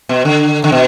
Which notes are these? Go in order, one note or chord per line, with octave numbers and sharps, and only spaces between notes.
B2
D3
D3
B2